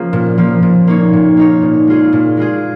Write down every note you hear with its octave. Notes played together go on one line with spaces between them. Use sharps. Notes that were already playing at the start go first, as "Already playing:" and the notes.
Already playing: F3 A#3 C#4 F4 G#4
A#2
F3 A#3
A#2
A#3 D#4 C#5
A#2
A#3 D#4 C#5
A#2
G#3 F4 G#4
A#2
G#3 F4 G#4